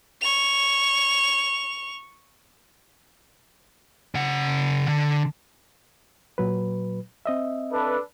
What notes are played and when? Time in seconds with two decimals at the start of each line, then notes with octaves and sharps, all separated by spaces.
0.21 C#6 F7
4.15 C#3 F#5
4.88 D3
6.38 A#2 F#3 B4
7.26 C4 D#5 E5
7.72 D4 A4 B4